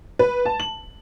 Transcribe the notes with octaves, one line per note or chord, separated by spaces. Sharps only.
B4
A5
F#7